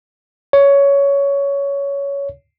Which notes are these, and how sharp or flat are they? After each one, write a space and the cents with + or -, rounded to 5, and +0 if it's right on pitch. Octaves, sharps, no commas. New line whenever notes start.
C#5 +15